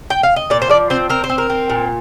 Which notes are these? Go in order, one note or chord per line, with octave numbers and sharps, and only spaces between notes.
G5
F5
D#5
A#2 D5
C5
F3 D5
C4 C5
C4 A#4
C5
C4
A#4
C4
A#2